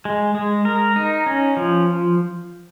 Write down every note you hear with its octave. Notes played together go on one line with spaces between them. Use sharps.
G#3
G#3
A#4
D#4
C#4
F3